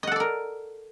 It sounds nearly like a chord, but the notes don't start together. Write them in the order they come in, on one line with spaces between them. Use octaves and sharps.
D#5 F#5 A4 D5 A#4